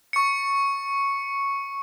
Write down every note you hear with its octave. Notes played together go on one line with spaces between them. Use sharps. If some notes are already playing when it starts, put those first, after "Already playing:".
C#6 C#7